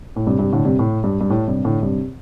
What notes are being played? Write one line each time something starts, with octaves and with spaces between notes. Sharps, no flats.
A2
G2 C3
G2 C3
A2 D3
G2 C3
A2
G2
G2
A2
G2 C3
A2 D3
G2 C3